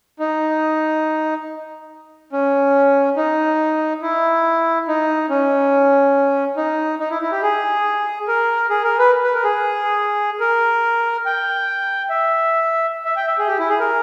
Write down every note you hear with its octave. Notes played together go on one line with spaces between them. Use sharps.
D#4
C#4
D#4
E4
D#4
C#4
D#4
D#4
E4
E4
G4
G#4
A#4
G#4
A#4
B4
B4
A#4
G#4
A#4
G5
E5
E5
G5
E5
G#4
G4
E4
G#4
A#4